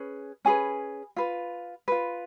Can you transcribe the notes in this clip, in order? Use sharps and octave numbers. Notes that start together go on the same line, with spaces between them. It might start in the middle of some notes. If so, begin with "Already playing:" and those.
Already playing: C#4 G#4 B4
C#4 G#4 B4 G#5
F4 B4
F4 B4